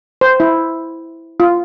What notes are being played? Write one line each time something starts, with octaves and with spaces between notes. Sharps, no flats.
C5
E4
F4